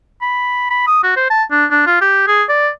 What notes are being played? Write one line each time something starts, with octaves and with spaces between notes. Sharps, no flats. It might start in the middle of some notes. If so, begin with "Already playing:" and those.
B5
B5
D#6
F#4
C5
A5
D4
D4
F4
G4
G#4
D5